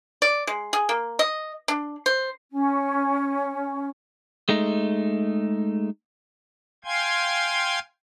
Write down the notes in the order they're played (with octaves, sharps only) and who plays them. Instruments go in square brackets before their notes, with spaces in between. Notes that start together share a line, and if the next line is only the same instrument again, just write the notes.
[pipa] D5
G#3
G#4
A#3
D#5
D4
C5
[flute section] C#4
[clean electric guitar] G#3 A3 D#4
[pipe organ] F5 G5 G#5 C6 G#6